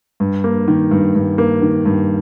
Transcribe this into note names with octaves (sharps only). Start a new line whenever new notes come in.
G2
A#3
D#3
G2
G2
A#3
D#3
G2